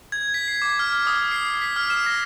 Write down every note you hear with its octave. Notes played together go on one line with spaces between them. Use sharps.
G#6
B6
C7
D6
F6
D#6
C7
B6
F6
E7
A#6